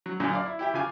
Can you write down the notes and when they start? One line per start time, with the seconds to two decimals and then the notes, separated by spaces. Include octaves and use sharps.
0.06 F#3
0.20 F#2 A#2 D3 C#4
0.31 D5 F5 A#5
0.46 E4
0.59 E4 G4 G5
0.74 C#3 F4 G#5 D6